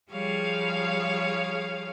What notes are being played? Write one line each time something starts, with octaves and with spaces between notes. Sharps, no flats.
F3 G3 G#4 C#5 F5